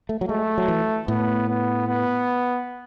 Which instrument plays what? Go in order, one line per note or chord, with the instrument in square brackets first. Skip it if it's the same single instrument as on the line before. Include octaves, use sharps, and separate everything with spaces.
[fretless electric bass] A3
F#3
[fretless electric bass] G#3 [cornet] A3
[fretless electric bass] F#3
E3
[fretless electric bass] A2 [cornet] B3
[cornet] B3
B3